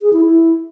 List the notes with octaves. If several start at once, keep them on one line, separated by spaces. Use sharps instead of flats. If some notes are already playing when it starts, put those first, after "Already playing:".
G#4
E4
E4